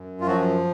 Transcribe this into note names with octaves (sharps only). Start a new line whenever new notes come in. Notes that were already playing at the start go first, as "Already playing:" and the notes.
Already playing: F#2
F4
F3 F#3 F#4